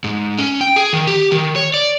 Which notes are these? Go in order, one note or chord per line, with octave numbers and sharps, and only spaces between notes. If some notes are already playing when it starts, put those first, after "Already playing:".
G#2
C#4
G5
G#4
D#3
G4
D#3
C#5
D5